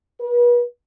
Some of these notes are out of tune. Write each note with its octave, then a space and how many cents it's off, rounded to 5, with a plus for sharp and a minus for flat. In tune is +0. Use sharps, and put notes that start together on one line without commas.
B4 -40